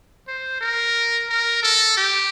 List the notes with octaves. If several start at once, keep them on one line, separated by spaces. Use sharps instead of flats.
C5
A#4
A#4
A4
G4